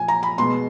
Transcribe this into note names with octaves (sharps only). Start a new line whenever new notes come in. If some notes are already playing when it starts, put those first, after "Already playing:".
Already playing: A#2 F3 G#5
A#5
B5
B2 G#3 B3 C6